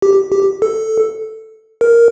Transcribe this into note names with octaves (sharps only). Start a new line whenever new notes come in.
G4
G4
A4
A#4